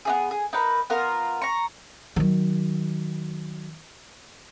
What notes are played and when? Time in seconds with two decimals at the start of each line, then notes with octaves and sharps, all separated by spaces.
0.05 B3 D#4 G#4
0.31 G#4
0.53 D#4 A#4 B4
0.90 B3 F4 A#4
1.42 A#5 C#6
2.16 D#3 F#3